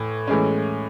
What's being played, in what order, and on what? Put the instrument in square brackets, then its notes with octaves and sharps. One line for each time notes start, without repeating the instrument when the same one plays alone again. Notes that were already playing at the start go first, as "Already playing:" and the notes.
Already playing: [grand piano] A2 E3
A2 E3 G#3 C#4